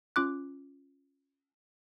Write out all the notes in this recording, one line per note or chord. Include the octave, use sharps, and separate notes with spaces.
C#4 F4 D6 F#6